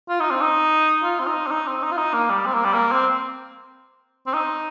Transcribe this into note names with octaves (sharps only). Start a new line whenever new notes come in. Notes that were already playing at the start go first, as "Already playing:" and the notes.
F4
D#4
C4
D#4
F4
C4
D#4
C4
D#4
C4
D#4
F4
D#4
A#3
G3
C4
A#3
G3
A#3
C4
C4
D#4